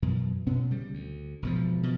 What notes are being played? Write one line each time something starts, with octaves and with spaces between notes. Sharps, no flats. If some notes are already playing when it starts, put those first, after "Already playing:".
F#2 B2 E3
B2 B3 C#4
C#3 G3
D2
E1 B2 F3
B2 F3